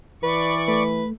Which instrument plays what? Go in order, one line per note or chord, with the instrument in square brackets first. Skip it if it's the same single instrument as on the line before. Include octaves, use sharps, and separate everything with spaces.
[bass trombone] E3 [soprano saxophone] B4 [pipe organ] D5 C#6
[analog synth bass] A3 [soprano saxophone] B4